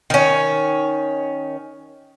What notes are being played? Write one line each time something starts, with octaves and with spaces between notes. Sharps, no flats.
D#3 C#4